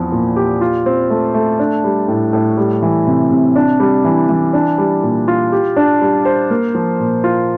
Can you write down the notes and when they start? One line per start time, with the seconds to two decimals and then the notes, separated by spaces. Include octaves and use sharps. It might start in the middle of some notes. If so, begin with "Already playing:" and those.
Already playing: E2 F3 C4
0.12 A#2
0.36 G4
0.61 F4
0.86 C4
1.10 A3
1.34 A3
1.59 D4
1.84 G3
2.08 A2
2.33 A2
2.57 G3
2.82 E3
3.07 C3
3.31 C3
3.56 D4
3.80 G3
4.04 E3
4.29 E3
4.53 D4
4.78 G3
5.03 A#2
5.28 F4
5.52 G4
5.77 D4
6.01 G3
6.25 C5
6.50 A#3
6.75 F3
7.00 A#2
7.24 F4